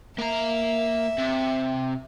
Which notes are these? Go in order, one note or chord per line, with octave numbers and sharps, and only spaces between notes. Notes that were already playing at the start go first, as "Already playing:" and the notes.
A#3 E5 A#5
C3